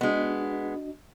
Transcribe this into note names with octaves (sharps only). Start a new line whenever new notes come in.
G#3 B3 D4 F#4 D#5